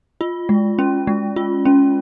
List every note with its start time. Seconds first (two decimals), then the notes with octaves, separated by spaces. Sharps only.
0.21 F4
0.49 G#3
0.79 C#4
1.07 G#3
1.36 F4
1.65 C#4